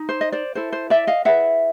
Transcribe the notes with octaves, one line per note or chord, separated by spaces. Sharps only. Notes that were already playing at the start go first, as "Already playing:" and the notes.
Already playing: D#4
C5
D#5
C5 D5
E4 A4 C5
C5
D5 E5
D#5 F5
E4 G#4 B4 E5 F#5